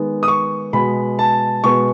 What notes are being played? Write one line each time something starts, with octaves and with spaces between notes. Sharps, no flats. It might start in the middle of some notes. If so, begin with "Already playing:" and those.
Already playing: D#3 G#3 B3
D#6
C#6
B2 G#3 B3 B5
A5
B2 G#3 B3 C#6